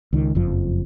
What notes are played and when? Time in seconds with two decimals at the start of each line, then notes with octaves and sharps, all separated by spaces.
0.13 C#2 D#3
0.35 F#1 F2 F3